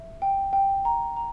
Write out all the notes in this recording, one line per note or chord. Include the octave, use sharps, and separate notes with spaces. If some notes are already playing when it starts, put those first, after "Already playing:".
Already playing: E5
G5
G5
A#5
A#5